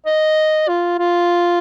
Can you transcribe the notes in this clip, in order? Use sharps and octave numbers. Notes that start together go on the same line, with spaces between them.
D#5
F4
F4